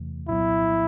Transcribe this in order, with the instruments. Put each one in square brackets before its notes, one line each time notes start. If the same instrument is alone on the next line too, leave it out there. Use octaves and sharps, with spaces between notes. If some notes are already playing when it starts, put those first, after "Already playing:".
Already playing: [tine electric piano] E2 C3 E3 A3
[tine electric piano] C2 A#2 F#3 B3 [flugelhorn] E4